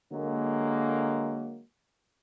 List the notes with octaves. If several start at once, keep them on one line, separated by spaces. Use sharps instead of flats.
D3 F#3 G#3 A#3